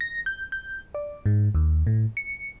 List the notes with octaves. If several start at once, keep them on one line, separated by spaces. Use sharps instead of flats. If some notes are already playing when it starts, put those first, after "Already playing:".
A#6
G6
G6
D5
G#2
D#2
A2
C#7